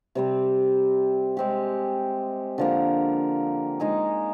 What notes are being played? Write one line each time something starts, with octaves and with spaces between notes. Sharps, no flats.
C3 G3 C4
G#3 C4 G4
D3 F3 A#3
G#3 D#4 G#4